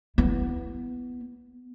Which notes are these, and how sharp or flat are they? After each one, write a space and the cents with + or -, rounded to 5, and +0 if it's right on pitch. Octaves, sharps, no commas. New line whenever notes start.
B3 +5 E4 +15